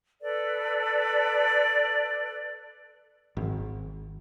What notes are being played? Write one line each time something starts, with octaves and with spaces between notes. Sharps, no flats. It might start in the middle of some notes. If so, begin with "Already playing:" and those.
A4 B4 D5
G#1